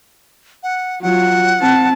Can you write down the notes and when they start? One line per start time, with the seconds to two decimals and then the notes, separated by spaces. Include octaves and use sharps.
0.63 F#5
1.02 F#3 F4 F#5
1.59 C4 A5